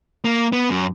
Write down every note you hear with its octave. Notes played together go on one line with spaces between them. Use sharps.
A#3
B3
F#2